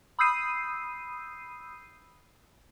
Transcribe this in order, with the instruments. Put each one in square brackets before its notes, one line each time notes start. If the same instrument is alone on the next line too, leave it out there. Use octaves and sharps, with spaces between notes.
[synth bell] B5 D#6 E6 G6 C7 D#7